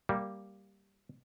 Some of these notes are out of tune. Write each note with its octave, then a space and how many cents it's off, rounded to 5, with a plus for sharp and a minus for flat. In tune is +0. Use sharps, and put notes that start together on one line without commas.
G3 +0 A#3 +0